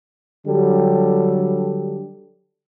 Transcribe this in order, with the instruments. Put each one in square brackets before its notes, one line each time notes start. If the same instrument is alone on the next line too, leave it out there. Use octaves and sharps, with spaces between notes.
[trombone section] D3 F#3 G3 G4 A4